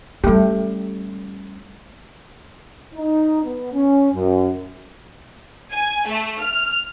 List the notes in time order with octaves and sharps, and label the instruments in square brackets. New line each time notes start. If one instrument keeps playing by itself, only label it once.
[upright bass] G3 C#4 [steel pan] A3 G4
[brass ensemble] D#4
B3
C#4
F#2
[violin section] G#5
A3
F6